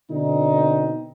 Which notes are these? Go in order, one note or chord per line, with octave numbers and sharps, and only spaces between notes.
B2 D3 C4 D#4